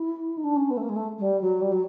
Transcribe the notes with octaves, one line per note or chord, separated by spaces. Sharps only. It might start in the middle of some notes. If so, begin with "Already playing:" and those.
Already playing: E4
D#4
D4
C#4
B3
A3
A#3
G#3
A3
G#3
G3
F#3
G3
F#3